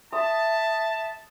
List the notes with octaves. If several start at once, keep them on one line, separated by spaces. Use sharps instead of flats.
E5 A5 D#6